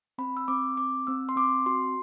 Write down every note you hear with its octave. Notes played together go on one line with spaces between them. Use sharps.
C4 B5
E6
C4 D6
C4 D6
C4 E6
C6
C4 D6
F#4 C6